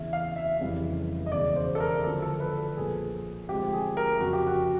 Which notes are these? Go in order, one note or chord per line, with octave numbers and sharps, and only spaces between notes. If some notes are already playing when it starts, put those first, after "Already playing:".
Already playing: E2 C#3 E3 E5
F5
E5
F1 F2 C#3 E3 G3
D#5
E1 E2 C#3 D5
C5
A4
A#4
D2 D3 F3 A4
A4
B4
A4
B1 A#2 F3 G#4
D2 C3 F3 G#3 G4
G#4
A#4
F1 F2 C#3 F#3 F#4
G4
F#4